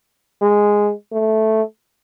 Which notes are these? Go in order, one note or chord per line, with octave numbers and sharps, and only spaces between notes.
G#3
A3